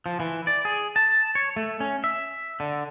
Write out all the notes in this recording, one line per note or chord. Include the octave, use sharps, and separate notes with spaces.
F3
E3
D5
G#4
A5
C#5
A3
C#4
E5
D3